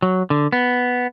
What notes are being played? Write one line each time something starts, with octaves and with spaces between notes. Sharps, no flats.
F#3
D3
B3